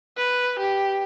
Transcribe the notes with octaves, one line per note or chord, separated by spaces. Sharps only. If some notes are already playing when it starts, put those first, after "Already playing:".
B4
G4